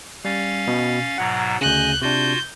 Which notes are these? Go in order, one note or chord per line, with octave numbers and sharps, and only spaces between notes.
G3 C#4 F5 A6
B2
G#2 B2 F#3 F#5 A#5
D2 C#3 D#5 G#5 F#6 G6
C3 D4 F4 F#4 G6